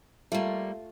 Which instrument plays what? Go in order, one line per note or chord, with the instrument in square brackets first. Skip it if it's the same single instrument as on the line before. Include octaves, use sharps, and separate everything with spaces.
[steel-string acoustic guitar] G3 A#3 [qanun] A3 F4